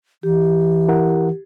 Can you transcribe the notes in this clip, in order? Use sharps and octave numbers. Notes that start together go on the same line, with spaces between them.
E3 G4
E4 A#4 F#5